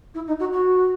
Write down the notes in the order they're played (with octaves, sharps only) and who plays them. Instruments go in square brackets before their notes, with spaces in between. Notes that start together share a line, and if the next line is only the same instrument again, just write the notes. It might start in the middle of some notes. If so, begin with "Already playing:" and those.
[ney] E4
D#4
F#4
F#4